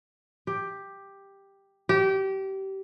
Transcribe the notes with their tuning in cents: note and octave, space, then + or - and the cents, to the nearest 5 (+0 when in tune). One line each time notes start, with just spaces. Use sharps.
G4 +5
G4 -25